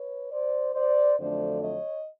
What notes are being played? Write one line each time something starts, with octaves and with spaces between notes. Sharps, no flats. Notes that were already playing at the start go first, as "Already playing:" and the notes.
Already playing: B4 C#5
C5 D5
C5 D5
F2 D3 F#3 A3 D4 C5 D5
C#5 D#5